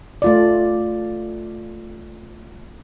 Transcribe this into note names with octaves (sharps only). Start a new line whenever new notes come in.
A3 F4 D5